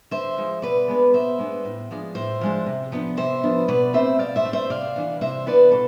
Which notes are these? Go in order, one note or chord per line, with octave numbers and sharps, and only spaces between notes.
D3 C5 E5
F3 G#3
B2 B4 D5
G#3 B3 D4
B2 C5 E5
G#3 B3 D4
A2
F3 G#3 D4
A2 C5 E5
F3 G#3 D4
C3
F3 B3 D4
C3 C5 E5
F3 B3 D4
B2 B4 D5
A3 C4 C5 E5
B2 D5 F5
C5 E5
A3 C4
C5 E5
C3 D5 F5
E3 B3 D4
C3 C5 E5
E3 B3 D4 B4 D5
B2 A4